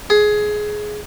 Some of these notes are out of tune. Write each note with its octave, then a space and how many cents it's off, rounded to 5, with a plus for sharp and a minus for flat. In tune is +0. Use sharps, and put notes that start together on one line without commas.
G#4 +15